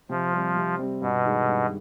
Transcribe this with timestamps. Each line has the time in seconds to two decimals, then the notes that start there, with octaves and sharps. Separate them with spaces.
0.09 C3 F3
0.33 G3 C4
0.56 C3
0.79 G3 C4
1.01 G2 B2
1.25 D#3 G#3
1.48 G2